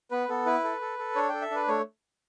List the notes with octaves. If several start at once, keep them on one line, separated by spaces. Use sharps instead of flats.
B3 B4
B3 A4
E4 B4
A4
A4
A4
D4 C#5
A4 G5
E5
D4 B4
A3 C#5